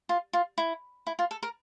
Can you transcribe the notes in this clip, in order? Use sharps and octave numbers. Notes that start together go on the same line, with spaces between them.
F4
F4
E4
E4
F4
A4
A#4